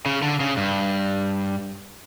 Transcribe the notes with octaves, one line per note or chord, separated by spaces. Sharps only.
C#3
D3
C#3
G2